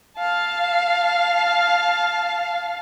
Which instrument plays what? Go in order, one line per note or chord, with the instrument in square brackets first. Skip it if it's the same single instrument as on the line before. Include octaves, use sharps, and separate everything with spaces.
[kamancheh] F5 A5